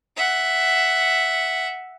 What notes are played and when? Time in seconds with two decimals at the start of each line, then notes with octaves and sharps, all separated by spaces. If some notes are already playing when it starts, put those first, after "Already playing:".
0.17 E5 F#5